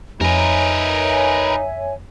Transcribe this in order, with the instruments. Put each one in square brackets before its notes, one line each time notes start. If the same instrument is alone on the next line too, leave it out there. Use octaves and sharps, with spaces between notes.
[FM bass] F2 [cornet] D#4 [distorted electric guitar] A#4 B4 [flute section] C#5 E5 G#5